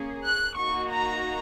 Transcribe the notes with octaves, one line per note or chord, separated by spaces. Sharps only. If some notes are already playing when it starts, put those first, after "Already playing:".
Already playing: A#3 C#4 G#4
F#6
A#3 D#4 F#4 C#6
A#5